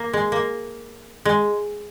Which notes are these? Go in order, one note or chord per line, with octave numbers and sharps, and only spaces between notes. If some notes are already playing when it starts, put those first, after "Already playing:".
Already playing: A#3
G#3
A#3
G#3